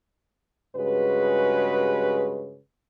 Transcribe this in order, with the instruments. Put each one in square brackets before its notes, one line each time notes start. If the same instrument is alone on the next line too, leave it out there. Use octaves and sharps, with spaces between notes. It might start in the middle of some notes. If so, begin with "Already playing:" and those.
[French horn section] G2 C#3 G#3 F#4 B4